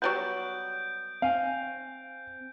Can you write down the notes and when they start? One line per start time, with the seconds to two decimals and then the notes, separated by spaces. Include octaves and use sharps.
0.02 F#3 G3 B3 G6 D7
1.22 C4 F5 G#5